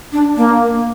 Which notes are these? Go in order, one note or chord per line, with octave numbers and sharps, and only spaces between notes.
D4
A#3